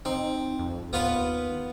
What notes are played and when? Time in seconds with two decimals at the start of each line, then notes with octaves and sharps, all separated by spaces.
0.05 C4 D#4
0.59 F2
0.93 D#2 B3 F4 B4